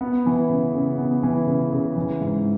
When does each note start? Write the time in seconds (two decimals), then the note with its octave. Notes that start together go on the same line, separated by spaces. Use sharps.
0.01 B3
0.26 E3
0.50 C#3
0.74 C#3
0.98 B3
1.23 E3
1.47 C#3
1.72 C#3
1.97 E3
2.21 G#2